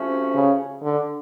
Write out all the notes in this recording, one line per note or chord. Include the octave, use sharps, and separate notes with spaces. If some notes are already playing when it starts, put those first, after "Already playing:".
Already playing: C3 F3 A3 C#4 F#4
C#3
D3